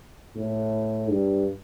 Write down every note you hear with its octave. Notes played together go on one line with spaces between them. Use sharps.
A2
G2